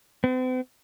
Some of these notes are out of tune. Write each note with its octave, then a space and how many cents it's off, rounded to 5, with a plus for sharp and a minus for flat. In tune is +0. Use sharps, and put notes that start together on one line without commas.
C4 -45